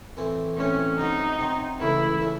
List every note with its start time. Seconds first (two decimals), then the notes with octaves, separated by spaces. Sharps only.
0.17 A2 E3 C4 E4
0.57 A2 E3 C4 C#4 E4
0.98 C3 F#3 C4 D#4
1.39 C3 F#3 C4
1.80 C#2 C#3 E3 A3 E4
2.21 C#3 E3 A3